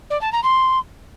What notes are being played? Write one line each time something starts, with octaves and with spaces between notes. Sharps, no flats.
D5
A5
A#5
C6